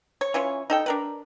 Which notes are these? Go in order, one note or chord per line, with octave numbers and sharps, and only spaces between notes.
C#5
E3 C#4 F4 C#5
D#4 A4 G5
D4 A#4 B4